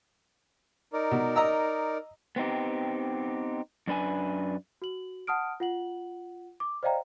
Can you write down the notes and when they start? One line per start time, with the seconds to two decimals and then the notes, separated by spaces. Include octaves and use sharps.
0.93 D#4 A#4 D5
1.11 B2
1.36 D#5 A#5 E6
2.36 B3 C4 D#4 G4
3.87 F#2 D4 B4 G#5
4.82 F#4 F#7
5.27 F#5 A5 D#6 F6 D7
5.60 F4 F#5 F#7
6.60 D6
6.83 C5 D5 D#5 F5 G5 A#5